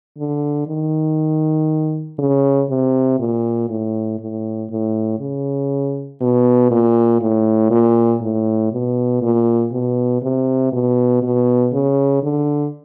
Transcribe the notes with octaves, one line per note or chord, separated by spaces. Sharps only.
D3
D#3
C#3
C3
A#2
A2
A2
A2
C#3
B2
A#2
A2
A#2
A2
B2
A#2
B2
C3
B2
B2
C#3
D3